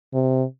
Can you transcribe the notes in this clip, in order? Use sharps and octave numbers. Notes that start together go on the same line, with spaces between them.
C3